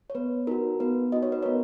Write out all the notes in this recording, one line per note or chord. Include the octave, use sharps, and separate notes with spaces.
C#5
B3 B4
D#4 F#4 A#4
B3 B4
D#4 F#4 D#5
C#5
B4
B3 A#4 C#5